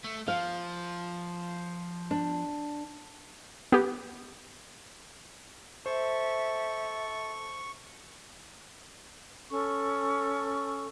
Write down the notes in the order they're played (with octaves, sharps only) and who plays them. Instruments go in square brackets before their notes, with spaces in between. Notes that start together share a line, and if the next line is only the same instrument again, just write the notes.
[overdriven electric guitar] A3
[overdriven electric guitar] F3 [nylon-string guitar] F5
[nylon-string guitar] D4
[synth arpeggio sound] B3 G4
[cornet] A4 [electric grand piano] C5 [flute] E5 [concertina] C#6
[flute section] C#4 A4 C#6